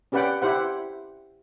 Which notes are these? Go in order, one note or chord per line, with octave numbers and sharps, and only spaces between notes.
C#4 G4 B4 D5 F#5 G5
E4 G4 C5 F#5